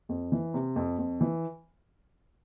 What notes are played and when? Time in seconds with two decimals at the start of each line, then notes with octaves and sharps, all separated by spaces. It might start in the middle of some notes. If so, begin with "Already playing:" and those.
0.09 F2
0.32 E3
0.54 C3
0.76 F2
0.98 F2
1.21 E3